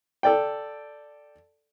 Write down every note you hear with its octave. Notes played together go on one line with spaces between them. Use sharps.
A4 D5 G5